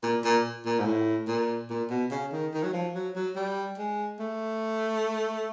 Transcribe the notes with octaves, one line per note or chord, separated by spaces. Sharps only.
A#2
A#2
A#2
G#2
A2
A#2
A#2
B2
C#3
D#3
D#3
F#3
F3
F#3
F#3
G3
G#3
A3